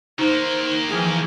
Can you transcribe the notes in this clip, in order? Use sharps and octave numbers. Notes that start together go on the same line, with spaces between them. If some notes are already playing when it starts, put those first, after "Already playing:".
D#3 A#3 D#4 C5
E3 F3 G#4 G5 F6